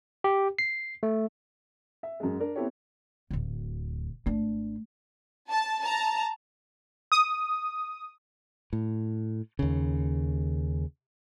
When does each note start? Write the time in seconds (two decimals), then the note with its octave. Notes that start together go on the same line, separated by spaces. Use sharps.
0.24 G4
0.59 C7
1.03 A3
2.03 E5
2.20 F#2 G#3
2.40 D4 A#4
2.55 B3 C4 E4 G4 A4 C#5
3.31 D1 D2
4.26 G#1 A3 D4
5.50 A5
5.83 A5 A#5
7.12 D#6
8.73 A2
9.59 D#2 C#3